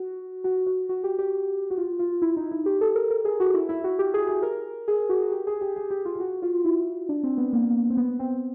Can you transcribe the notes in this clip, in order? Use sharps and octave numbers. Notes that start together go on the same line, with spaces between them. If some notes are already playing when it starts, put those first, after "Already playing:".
Already playing: F#4
F#4
F#4
F#4
G4
G4
F#4
F4
F4
E4
D#4
E4
G4
A4
A#4
A#4
G#4
F#4
E4
E4
F#4
G4
G#4
G#4
A#4
G#4
F#4
G4
G#4
G4
G#4
G4
F4
F4
F#4
F4
E4
D4
C4
B3
A#3
C4
B3
C4